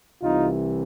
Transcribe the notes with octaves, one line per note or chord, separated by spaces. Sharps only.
C2 C3 E3 D#4 F4